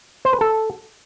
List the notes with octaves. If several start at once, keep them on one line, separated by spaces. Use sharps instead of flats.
C5
B4
A4